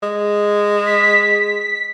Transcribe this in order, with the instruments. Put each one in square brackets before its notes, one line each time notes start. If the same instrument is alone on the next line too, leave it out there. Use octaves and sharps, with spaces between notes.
[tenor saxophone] G#3
[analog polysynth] B6